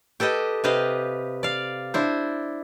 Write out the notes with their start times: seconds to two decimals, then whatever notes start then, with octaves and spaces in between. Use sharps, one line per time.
0.20 G4 A4 B4 D#5 G5
0.64 C3 G4 B4 D#5 F5
1.43 D5 F5
1.94 D4 E4 C5